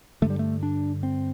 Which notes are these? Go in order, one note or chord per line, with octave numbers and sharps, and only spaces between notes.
G2 D3 A3
G3
A3
D4
C4